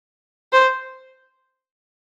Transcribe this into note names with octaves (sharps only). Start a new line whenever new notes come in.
C5